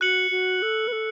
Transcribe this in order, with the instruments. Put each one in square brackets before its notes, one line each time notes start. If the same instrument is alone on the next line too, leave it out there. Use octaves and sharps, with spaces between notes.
[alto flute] F#4 [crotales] F#6 C#7 F#7
[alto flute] F#4
A4
B4
A4